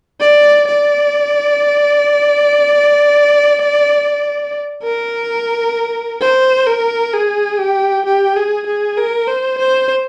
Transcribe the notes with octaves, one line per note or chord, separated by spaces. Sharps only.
D5
D5
A#4
C5
A#4
G#4
G4
G4
G#4
G#4
A#4
C5
C5